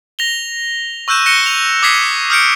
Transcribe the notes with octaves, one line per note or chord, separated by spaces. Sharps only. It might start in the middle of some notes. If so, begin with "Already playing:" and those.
A#6 F7 G7
C#6 E6 F#6 G6 D#7 E7
F#6 A#6 C#7 E7 G7
F7
D6 D#6 G#6 B6 C7 E7
D#6 F6 G6 C#7 D7